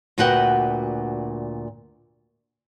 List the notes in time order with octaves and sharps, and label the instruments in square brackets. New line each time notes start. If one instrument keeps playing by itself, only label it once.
[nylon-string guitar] D2 A#2 B3 F#4 F#5 G5